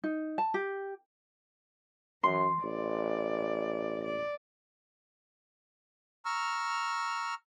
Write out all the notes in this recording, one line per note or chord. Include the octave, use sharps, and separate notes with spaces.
D#4
A5
G4
F#2 E3 C6
A1 D5
D5
A#5 C#6 E6 F6